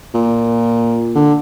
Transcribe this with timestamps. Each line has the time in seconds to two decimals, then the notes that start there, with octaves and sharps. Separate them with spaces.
0.14 A#2
1.15 D3